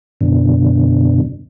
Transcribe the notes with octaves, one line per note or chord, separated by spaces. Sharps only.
F#2 B2 D3